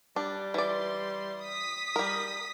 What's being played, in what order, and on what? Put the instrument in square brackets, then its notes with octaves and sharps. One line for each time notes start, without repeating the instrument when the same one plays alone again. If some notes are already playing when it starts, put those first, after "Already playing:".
[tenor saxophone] G3 [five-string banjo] D4
[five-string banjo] E3 D5 [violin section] C6
[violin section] D#6 B6
[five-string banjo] G3 A#4